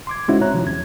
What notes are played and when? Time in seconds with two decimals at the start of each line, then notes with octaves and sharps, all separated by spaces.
0.07 C6 D6 G#6
0.28 G#3 C4 C#4 D#4 E4 F#4
0.41 C#5 A#5 F#6
0.54 C3 D#3 F3
0.66 E2 G#6